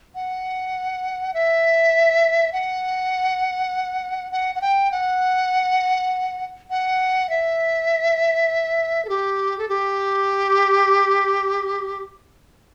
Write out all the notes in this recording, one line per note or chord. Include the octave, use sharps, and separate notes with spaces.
F#5
E5
F#5
F#5
F#5
G5
F#5
F#5
E5
A4
G4
A4
G4